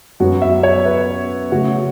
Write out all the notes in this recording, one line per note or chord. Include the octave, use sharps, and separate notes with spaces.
F#2 F#3 B3 F#4
E5
C#5
B4
C#3 A3 C#4 F#4